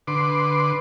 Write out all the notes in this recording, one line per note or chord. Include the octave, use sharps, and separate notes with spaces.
D3 B4 C6 D6